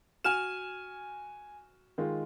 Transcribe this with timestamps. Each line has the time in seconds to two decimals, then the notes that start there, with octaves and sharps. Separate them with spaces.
0.24 F#4 G#5 F6 E7
1.98 D#3 G#3 F4